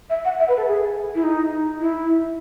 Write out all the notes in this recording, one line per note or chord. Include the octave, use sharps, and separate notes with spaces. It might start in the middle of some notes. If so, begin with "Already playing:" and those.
E5
F#5
E5
B4
A4
G#4
E4
D#4
E4